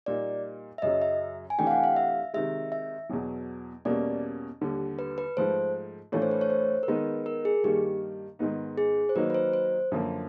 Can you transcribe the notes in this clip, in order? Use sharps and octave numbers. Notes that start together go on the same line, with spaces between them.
A#2 G3 A#3 D#4 D5
E5
F#2 C#3 F#3 D#5
E5
G#5
C3 E3 A3 D4 G4 G5
F5
F#5
F5
E5
C3 D#3 G#3 E5
E5
E2 B2 F#3
E2 B2 G3 A#3 C#4 D5
D#2 D3 G3
B4
B4
G#2 F3 A3 C5
A2 E3 A3 D4 F4 C#5
C5
B4
C#5
C5
A#4
D#3 G#3 B3 D#4 B4
A#4
G#4
G2 D#3 G3 A#3 G4
G#2 D#3 G#3 B3 D#4
G#4
C5
D#3 F#3 A#3 D#4 B4
B4
C5
C5
F#2 D3 F3 A#3